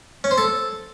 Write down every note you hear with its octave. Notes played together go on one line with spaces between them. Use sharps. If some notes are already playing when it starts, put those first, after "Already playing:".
C#4
C5
A4